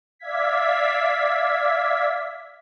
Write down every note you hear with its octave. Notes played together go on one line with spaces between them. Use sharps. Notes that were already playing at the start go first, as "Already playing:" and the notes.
D5 E5 F5 G#6 B6